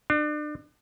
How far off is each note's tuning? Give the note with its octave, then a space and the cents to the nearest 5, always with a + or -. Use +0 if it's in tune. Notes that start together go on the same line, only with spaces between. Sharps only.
D4 +35